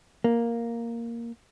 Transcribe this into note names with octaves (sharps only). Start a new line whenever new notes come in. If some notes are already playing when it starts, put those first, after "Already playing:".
A#3